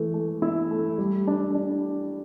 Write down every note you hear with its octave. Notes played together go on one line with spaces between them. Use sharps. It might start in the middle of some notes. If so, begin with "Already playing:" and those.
Already playing: E3 A3
A3
E4
A3
G3
D4
D4